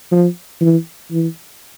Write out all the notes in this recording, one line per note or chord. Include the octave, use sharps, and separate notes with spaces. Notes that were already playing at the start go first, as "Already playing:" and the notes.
F3
E3
E3